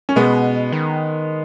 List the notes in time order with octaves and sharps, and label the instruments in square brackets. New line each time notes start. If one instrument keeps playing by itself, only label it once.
[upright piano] C#4
[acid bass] B2 [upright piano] G#3 B3
[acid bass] D#3